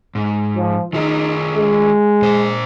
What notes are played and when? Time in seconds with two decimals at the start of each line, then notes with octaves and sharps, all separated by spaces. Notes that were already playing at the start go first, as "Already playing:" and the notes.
0.15 G#2
0.56 F3
0.93 D#3 D#4 F4 G#4
1.55 G#3
2.22 A#2 C5